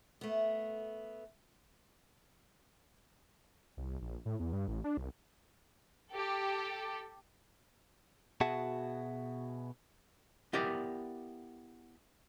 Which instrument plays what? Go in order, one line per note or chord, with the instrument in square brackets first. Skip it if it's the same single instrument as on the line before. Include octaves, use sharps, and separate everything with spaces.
[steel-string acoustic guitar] A3 B3
[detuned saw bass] C2
A#1
A2
E2
G2
A1
D4
C2
[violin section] G4 A4
[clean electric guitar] B2 F#4 G#4 E5 F#5 A5
[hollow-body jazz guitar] B3 E4 G4 A#4 D5